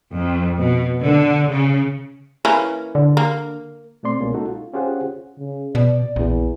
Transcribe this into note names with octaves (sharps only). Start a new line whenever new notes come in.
F2
B2
D3
C#3
E3 A#3 C#4
D3
A#3
B2 A3 C4 D5 C6
C2 B2 G#3 A#3 C#4
D#4 F#4 A4
F4
C#4 F4 G4 G#4 C5 F#5
C#3
B2 D5
A#1 E2